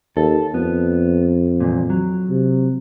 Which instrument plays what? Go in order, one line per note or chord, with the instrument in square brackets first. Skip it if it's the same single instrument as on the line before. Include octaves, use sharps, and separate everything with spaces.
[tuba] D#2 [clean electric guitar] A4
[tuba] F2 [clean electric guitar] B3
[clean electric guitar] E2 G2 A#2
F#3
[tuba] C3